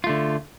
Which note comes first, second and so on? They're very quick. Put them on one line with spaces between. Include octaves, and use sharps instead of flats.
F4 A3 D3